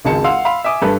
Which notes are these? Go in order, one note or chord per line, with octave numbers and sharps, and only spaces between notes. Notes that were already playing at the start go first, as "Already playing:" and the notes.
G#1 C#2 G#3 A5 C#7
F5 F#5 C6 E6
F5 B5 C6
E5 G#5 D6 D#6
G2 A4 B4